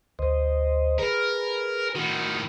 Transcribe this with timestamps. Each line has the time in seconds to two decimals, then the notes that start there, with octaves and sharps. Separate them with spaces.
0.19 D2 C5 D#5
0.98 G#4 A#4 B4
1.95 A2 D#3 F#4 D#6